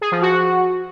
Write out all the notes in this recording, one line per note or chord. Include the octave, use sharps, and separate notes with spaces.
G#4
F3
F#4